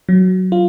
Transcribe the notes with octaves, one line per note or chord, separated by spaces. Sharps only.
F#3
F4